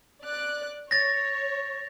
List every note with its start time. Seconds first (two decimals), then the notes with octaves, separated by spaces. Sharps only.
0.23 D5 F#6
0.91 C#5 A6 A#6